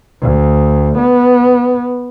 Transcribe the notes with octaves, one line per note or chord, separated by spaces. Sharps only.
D2
B3